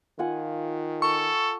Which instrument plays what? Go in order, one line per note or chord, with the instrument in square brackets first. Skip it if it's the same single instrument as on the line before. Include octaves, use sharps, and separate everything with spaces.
[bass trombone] D#3 [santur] F4 F#5 G#5
[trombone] A4 [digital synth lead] C#6